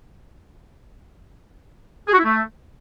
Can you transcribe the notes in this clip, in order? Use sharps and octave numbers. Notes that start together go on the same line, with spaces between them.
G#4
F#4
E4
A3